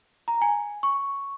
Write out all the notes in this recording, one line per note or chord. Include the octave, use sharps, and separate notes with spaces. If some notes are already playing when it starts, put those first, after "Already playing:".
A#5
G#5
C#6